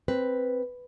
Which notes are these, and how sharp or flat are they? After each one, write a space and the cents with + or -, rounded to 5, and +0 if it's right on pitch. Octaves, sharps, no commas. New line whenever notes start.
C4 +0 B4 +0